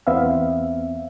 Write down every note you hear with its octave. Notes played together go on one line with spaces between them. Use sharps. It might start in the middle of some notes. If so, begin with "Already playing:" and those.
E2 B3 C4 E5 F5